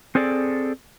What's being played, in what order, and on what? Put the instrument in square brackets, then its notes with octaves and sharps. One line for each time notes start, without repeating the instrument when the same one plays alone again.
[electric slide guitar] C4 G#4 A4 D5